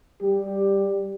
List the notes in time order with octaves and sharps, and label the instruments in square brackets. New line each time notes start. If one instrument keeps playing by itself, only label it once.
[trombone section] G3 G4